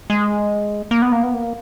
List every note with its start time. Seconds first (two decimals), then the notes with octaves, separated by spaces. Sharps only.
0.10 G#3
0.91 A#3
1.02 B3
1.12 A#3
1.23 B3
1.34 A#3